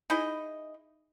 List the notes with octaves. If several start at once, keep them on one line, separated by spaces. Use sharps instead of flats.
D#4 E4 G#4 D#5